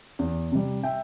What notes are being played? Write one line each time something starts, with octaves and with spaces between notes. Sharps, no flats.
E2
C3 G3
E5 G5